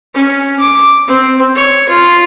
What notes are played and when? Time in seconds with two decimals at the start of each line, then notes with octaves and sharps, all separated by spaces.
0.14 C#4
0.59 D6
1.07 C4
1.55 C#5
1.89 F4